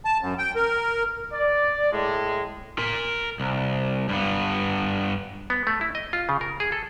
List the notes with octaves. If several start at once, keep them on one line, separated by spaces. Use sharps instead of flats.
A5
F#2
G5
A#4
D5
A2 G#3
A#4 C6
C2
G2 B3
B3
A3
E4
D#5
F4
C#3
A#4
G#4
A4